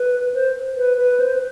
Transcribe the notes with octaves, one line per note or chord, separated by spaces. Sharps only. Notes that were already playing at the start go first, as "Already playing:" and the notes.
Already playing: B4
C5
B4
B4
C5